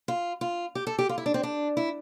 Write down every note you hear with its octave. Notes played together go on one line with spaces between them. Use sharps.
F4
F4
G4
A4
G4
F4
E4
D4
C4
D4
E4